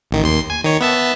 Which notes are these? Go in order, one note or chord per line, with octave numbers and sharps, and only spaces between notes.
A1 D#3
D#2 C6
G#5
D#3 C#5
B3 E5 A5